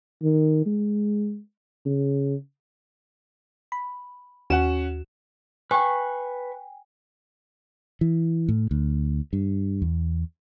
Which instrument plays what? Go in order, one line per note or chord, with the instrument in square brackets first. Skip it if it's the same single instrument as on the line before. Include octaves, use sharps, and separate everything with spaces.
[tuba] D#3
G#3
C#3
[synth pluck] B5
[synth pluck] D#2 F#4 E7 [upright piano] C#4 F#5
[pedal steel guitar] B4 C#6 [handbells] G5 G#5
[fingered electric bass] E3
A2
D2
G2
E2